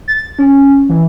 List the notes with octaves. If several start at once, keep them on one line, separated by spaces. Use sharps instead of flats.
A6
C#4
E3